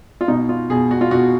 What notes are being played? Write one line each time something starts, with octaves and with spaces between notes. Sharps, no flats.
F4
B2 D#4
F4
B2 G#4
F#4
F4
B2 F#4